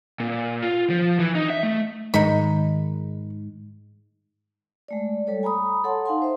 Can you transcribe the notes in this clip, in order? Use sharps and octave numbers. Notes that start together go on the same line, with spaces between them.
A#2
F4
F3
E3
D#4
E5
A3
G#2 D#3 G#3 D#4 B5
G#3 A3 D5
G3 A4 C#5
G#5 A#5 B5 D#6
A4 C#5 F#5 A5 C6
D#4 F5 F#5 G#5 C6
C5 E5